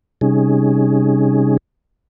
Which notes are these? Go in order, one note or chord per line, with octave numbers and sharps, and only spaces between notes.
C3 G3 C#4 D#4 G#4